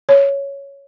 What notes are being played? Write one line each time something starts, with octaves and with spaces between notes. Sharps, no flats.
C#5